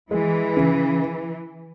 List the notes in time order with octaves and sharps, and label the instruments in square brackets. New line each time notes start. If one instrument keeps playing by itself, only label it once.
[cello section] E3 [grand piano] G#3
[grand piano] C#3